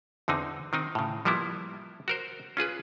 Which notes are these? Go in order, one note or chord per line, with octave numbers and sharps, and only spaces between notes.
E2 D3 C4 D#4
D#3 C4 D#4
A2 C#3
F3 G3 A#3 B3 E4
F#4 A#4 C5
C#4 F4 G#4 B4